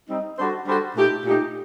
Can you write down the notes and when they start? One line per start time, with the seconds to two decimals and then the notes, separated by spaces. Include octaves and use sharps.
0.10 G3 C4 D#4
0.39 G3 D4 F#4 A4 C5
0.68 G3 D4 F#4 A4 C5
0.97 A#2 A3 D#4 G4
1.26 A#2 A3 D#4 G4